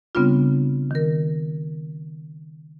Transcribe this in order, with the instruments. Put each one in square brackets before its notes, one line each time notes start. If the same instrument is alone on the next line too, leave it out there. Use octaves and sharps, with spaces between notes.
[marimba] C#3 G3 B3 C4 D4 F4
D#3 A#4